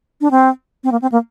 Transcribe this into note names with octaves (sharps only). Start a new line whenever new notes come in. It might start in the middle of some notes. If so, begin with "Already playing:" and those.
D4
C4
C4
A#3
C4
A#3